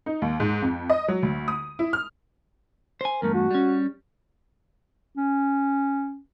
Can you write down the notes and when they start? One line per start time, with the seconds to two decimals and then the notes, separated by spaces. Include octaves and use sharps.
0.06 D#4
0.22 D#2
0.40 G#2
0.62 F2
0.90 D#5
1.08 F#3
1.23 D2
1.48 D#6
1.79 E4
1.93 F6
3.01 C5 G#5
3.22 E2 G2 A3 A#4
3.34 F#4
3.51 G3 C#4
5.17 C#4